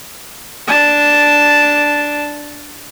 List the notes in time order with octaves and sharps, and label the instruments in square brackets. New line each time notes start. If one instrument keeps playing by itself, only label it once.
[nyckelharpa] D4 A5